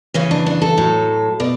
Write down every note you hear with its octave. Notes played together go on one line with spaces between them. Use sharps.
C#3 E3 C#4
D4
D4
A4
A2 F#3
B2 D5